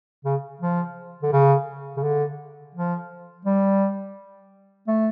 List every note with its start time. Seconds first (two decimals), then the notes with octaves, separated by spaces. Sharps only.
0.25 C#3
0.61 F3
1.23 D3
1.32 C#3
1.97 C#3
2.03 D3
2.75 F3
3.45 G3
4.88 A3